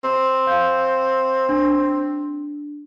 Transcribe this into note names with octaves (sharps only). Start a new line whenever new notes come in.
C4
F5 G6
D4